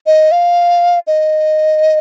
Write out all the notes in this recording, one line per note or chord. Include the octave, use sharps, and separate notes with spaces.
D#5
F5
D#5